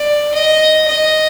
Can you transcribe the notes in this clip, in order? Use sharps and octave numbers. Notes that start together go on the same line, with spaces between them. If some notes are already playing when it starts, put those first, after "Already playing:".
Already playing: D5
D#5
D#5